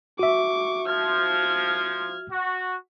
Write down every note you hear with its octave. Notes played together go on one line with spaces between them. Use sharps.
F#4 E5 C#6 D6
F3 F6 G#6
F#4